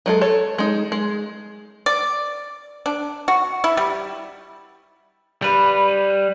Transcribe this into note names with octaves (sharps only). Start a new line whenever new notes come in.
F#3 G#3 A4
A4 C#5
G#3 D#4
G#3
D5
D4
F#4
E4
G3
G3 B4